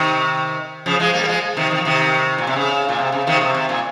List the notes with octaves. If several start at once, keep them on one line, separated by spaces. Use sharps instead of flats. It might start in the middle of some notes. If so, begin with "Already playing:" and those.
Already playing: C3 D#3
C#3 F3
F3 G#3
G3 A#3
A#3
F3 G#3
C3 D#3
D#3
F3
C3 D#3
A#2
C3
C#3
A#2
C3
C#3
C3 D#3
C3
C3
A#2